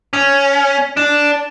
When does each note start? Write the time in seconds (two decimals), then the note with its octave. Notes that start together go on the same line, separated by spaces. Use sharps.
0.13 C#4
0.97 D4